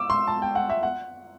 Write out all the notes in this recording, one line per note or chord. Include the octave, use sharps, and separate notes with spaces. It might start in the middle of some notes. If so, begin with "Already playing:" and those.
Already playing: D6 E6
C6
A5
G5
F#5
E5
F#5